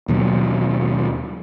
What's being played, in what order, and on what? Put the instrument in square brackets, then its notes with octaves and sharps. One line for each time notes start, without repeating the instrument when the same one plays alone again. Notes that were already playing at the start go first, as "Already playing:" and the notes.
[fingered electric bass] D#2 B2 F#3